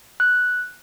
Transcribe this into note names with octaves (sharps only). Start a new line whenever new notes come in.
F#6